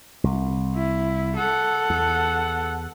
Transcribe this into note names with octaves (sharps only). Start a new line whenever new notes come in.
C2
E4
A4 F#5
E2